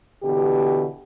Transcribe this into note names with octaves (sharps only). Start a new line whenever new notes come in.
B2 D3 E3 G4